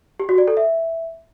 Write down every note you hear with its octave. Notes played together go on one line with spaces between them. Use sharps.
G4
F#4
D5
A4
E5